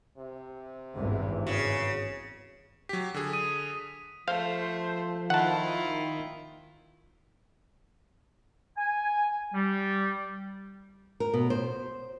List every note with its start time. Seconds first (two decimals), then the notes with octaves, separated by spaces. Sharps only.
0.18 C3
0.97 G#1 E2 G2
1.47 C#3 F#4
2.89 F#3 G4 B6
3.14 D3 G#4 B6
3.33 D#6 D#7
4.28 F3 A3 C5 F5
5.30 D#3 E4 F4 F#5 A5
8.77 G#5
9.53 G3
11.20 A#4
11.34 B2
11.50 C5